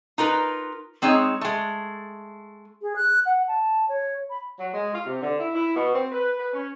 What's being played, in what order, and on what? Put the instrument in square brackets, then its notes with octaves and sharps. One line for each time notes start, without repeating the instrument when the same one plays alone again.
[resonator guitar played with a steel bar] D#4 F4 A#4 B4
G#3 C4 D#4 G#4 C#5
G#3 A3
[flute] G#4
F#6
F#5
A5
C#5
B5
[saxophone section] F#3
G#3
F4
C3
D3
E4
E4
B2
C4
B4
B4
C#4